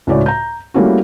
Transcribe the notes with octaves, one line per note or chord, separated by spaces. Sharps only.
C#2 A2 F#4 C#5 D5
A#5 G6
G3 A3 A#3 C#4 E4 F#4